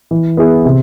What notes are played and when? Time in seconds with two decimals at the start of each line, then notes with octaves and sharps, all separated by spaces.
0.11 E3
0.37 B3 E4 G#4
0.65 C3